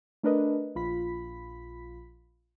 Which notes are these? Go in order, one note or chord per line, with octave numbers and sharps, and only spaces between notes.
A3 D4 A#4 B4 D#5
A#1 F4 B5 B6